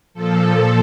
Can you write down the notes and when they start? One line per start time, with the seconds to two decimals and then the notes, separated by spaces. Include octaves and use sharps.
0.14 A#2 F3 A4